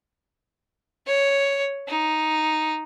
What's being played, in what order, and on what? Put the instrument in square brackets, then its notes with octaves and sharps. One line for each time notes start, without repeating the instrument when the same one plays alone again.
[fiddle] C#5
D#4